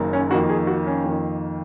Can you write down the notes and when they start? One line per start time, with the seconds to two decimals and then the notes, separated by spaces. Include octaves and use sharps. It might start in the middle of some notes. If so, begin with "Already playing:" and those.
Already playing: F#1 F#2 D#3 A#3
0.13 C#4
0.31 F2 D#3 A#3 F#4
0.49 G#4
0.67 F#4
0.87 C#4
1.04 F2 D#3 A#3